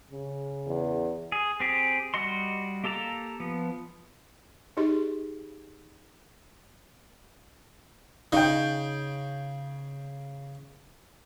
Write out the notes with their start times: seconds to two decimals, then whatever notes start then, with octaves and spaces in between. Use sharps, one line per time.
0.10 C#3
0.67 E2
1.32 G#4
1.60 C4 G4 G#4
2.14 G3 F#4 D#5 C6
2.84 A#3 G4 A4 A5 A#5
3.40 F3 B3
4.77 D#4 G4 G#4 D#5 C6
8.32 C#3 D#4 G5